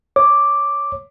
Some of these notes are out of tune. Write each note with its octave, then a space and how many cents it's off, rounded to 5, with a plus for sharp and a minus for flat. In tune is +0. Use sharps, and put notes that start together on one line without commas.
C#5 +0 D6 +0